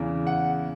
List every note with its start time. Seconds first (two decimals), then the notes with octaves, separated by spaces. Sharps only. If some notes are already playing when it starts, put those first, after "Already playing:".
Already playing: E2 C#3 E3
0.27 F#5